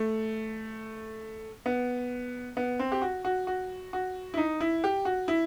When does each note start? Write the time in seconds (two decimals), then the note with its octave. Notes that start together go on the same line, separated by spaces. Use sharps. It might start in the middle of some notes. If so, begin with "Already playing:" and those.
Already playing: A3
1.66 B3
2.57 B3
2.79 C4
2.92 G4
3.02 F#4
3.25 F#4
3.47 F#4
3.93 F#4
4.34 E4
4.37 D#4
4.60 E4
4.84 G4
5.05 F#4
5.28 E4